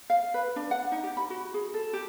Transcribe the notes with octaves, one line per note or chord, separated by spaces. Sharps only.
F5
B4
D4
F#5
D#4
G4
B5
F#4
G#4
A4
G4